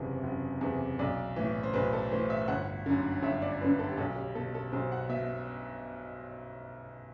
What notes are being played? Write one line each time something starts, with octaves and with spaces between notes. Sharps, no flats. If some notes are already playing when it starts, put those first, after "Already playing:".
Already playing: F#1 E2 C3 E3
F#1
E2 C3 E3
B1 D5
A2 E3
C5
B1 B4
A4
A2 E3 C5
E5
G1 F#5
F#2 D3
G1 E5
D5
F#2 D3 B4
A4
G4
B1 A4
G4
B2 A4
A4
B1 C5
F#5
B2 E5